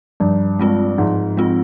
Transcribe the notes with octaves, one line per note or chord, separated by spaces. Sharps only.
G2 F3
G#3 C4 F4
G#2 F3
G#3 C4 F4